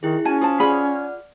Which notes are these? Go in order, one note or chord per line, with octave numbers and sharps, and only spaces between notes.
D#3 E4 G4 G#4
C#4 F#4 G#5 A5
F4 C5 A5 D#6
F4 G#4 D5 F#5 B5 F6